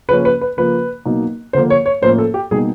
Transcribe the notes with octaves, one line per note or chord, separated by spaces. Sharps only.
C#3 F3 A#3 C#4 B4
B4
B4
C#3 F3 A#3 B4
B2 F#3 A#3 D#4
D3 F3 A#3 C5
C#5
C#5
A2 F3 A#3 C#4 C5
A4
G4
B2 G3 A#3 D#4 G#4